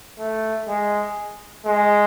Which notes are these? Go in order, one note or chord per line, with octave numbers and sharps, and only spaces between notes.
A3
G#3
G#3